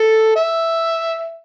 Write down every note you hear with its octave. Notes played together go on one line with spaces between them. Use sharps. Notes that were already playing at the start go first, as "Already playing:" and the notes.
Already playing: A4
E5